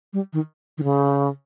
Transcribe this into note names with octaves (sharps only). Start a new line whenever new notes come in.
G3
D#3
D#3
C#3